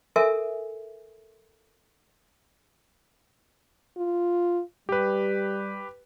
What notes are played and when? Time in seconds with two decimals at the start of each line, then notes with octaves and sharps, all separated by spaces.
0.16 A4 A#4 E5 G#5
3.97 F4
4.89 G3 G4 B4